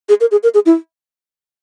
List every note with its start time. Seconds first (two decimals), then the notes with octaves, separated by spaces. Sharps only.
0.09 G#4
0.21 A#4
0.31 G#4
0.43 A#4
0.54 G#4
0.66 E4